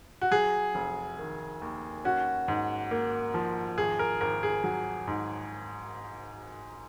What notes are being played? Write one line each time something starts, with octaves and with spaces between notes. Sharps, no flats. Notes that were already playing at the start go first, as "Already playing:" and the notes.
F#4
F#3 G#4
F1
D#3
D#2
C#4 F#4
G#2
A#3
F3
G#1 G#4
A#4
G#1 A#4
G#4
F#3
G#2